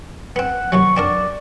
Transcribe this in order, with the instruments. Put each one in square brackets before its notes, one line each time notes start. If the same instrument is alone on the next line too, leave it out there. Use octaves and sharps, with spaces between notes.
[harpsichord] B3 C4 [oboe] F#5
[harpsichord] D#2 C3 F#3 [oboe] C#6
[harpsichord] C4 D4 A#4 [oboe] D5